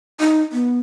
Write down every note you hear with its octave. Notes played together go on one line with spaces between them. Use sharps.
D#4
B3